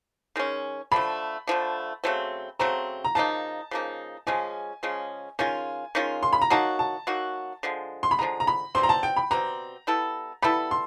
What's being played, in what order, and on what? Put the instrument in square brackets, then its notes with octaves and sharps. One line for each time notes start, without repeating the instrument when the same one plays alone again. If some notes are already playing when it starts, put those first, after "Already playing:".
[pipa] D#3 G#3 C#4
[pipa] D3 F3 A3 [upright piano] B5
[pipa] D3 F3 A3
C#3 F#3 A3 C4
[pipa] C#3 F#3 A3 C4 [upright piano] A#5
[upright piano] A#5
[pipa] C#3 F3 A#3 D#4 [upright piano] A5
[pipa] C#3 F3 A#3 D#4
[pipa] C#3 F3 G#3 C#4 [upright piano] G#5
[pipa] C#3 F3 G#3 C#4
[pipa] D#3 G#3 C#4 F4 [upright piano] G#5
[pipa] D#3 G#3 C#4 F4
[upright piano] C6
B5
A#5
[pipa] F#3 A#3 D#4 F#4 [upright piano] A5
[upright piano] A5
[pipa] F#3 A#3 D#4 F#4
D3 F3 G#3
[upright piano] C6
B5
[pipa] D3 F3 G#3 [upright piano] A#5
[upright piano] A#5
B5
[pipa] B2 G3 C4 [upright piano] C6
[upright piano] A#5
A5
G5
B5
[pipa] B2 G3 C4 [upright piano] A#5
[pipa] G3 B3 E4 A4
[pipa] G3 B3 E4 A4 [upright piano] B5
[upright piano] C6